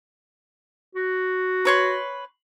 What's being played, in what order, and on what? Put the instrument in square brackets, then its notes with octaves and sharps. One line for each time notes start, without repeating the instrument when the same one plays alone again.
[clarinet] F#4
[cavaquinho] B4 C#5 C6